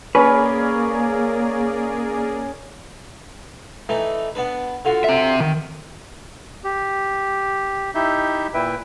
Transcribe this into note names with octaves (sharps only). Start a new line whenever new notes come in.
A#3 C#4 G#4 A#4 B4 D5
E3 A3 D#4
B3 D4 B4
D3 F4 F#4
C4 E5
D#3
G4
D#4 E4 G4 E5 G6
A#2 E4 B4 E5 G5